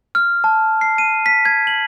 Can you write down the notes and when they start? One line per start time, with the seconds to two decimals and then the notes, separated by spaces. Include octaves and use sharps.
0.15 F6
0.44 A5
0.81 C7
0.98 D#7
1.26 B6
1.45 G#6
1.67 F#7